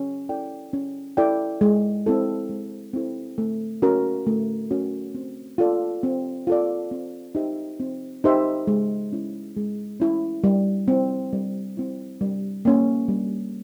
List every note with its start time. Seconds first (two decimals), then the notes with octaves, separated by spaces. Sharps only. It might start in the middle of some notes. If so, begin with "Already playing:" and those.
Already playing: C#4
0.29 E4 A4 D5 G5
0.73 C#4
1.17 E4 A4 D5 G5
1.61 G#3
2.06 C4 E4 A4
2.49 G#3
2.93 C4 E4 A4
3.38 A3
3.82 C#4 F#4 A#4
4.27 A3
4.71 C#4 F#4 A#4
5.15 C4
5.58 F4 A4 D5
6.03 C4
6.47 F4 A4 D5
6.91 C4
7.35 D#4 G4 C5 E5
7.80 C4
8.24 D#4 G4 C5 E5
8.67 G#3
9.12 C#4 E4
9.57 G#3
10.00 C#4 E4
10.44 G3
10.88 C4 E4
11.33 G3
11.77 C4 E4
12.21 G3
12.65 A#3 C#4
13.08 G3